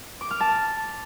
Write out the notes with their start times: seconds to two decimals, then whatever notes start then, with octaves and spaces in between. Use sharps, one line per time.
0.21 D6
0.31 F6
0.40 A5